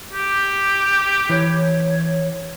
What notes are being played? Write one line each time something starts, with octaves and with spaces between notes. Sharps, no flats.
G4
E3 C#5